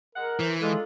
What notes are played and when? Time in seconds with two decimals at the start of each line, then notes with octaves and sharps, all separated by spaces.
0.15 G#3 A#4 F#5
0.40 E3 C5
0.61 G#3 D4 D#4 F4 A4